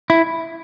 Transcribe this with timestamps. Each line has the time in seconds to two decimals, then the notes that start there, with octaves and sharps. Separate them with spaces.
0.10 E4